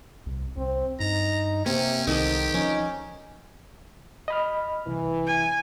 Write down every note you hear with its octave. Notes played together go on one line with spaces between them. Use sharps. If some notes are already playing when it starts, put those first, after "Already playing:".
C2
C2 C4
G2 D#4 A#5
C3 A#3 C4 C#4
C2 G#2 D#3 G4 A4 D#5
F3 C#4 D#4
D#5 B5 F6
C2 E3
G#5